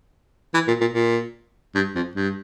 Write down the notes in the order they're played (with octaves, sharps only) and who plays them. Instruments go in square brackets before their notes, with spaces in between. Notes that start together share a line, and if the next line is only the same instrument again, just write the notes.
[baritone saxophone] E3
A#2
A#2
A#2
G2
F2
G2